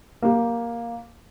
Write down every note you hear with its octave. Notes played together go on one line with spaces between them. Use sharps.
A#3 G4